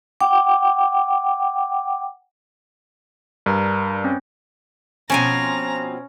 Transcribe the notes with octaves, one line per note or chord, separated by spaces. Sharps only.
F#5 G5 D6
G2 D4 A#4 A#5
C4 C#4
B2 F3 C4 C#4 G#5 A#5